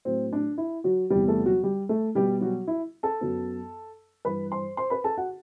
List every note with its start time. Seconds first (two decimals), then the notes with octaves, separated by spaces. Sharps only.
0.05 A2 F#3 A3 C4 C5
0.33 D4
0.58 E4
0.84 F#3 F#4
1.10 E2 C3 G3 B3 G4
1.28 A3 A4
1.45 F#3 F#4
1.63 G3 G4
1.89 A3 A4
2.15 B2 G3 B3 G4
2.41 F#3 F#4
2.67 E4
3.03 A4 A5
3.21 F#2 F#3 B3
4.25 G2 E3 G3 B4 B5
4.52 C5 C6
4.77 C5 C6
4.90 B4 B5
5.04 A4 A5
5.18 F#4 F#5